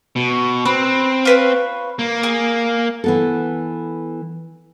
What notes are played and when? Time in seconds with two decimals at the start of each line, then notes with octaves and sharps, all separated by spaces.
0.16 B2
0.65 C4 B4
1.25 F4 B4 C#5
1.99 A#3
2.23 G#4
3.04 E3 B3 A4